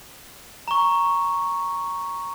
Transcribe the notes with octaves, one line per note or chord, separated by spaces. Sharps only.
A#5 C#6